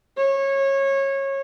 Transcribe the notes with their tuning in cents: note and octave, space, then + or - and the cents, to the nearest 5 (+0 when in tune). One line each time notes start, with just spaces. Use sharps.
C#5 -20